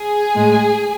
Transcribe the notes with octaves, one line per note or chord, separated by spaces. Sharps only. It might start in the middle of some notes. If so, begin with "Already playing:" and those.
Already playing: G#4
A2 G#3